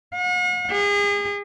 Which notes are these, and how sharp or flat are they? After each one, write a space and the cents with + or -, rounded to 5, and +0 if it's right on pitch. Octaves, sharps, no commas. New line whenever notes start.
F#5 -45
G#4 -35